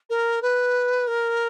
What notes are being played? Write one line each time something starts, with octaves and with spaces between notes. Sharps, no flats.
A#4
B4
A#4